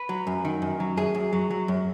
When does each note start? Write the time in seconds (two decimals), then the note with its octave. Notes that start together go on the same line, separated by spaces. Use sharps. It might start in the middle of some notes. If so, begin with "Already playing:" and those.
Already playing: B4
0.09 F#3
0.27 F#2
0.45 D#3
0.62 F#2
0.80 F#3
0.97 F#2 G#4
1.15 F#2
1.33 F#3
1.51 F#3
1.68 F#2